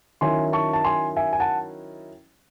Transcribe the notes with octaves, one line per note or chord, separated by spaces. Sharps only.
D#3 F#3 C#4 E4 G#5 C6
A5 C#6
A5
G#5 C6
E5 G#5
G#5
F#5 A5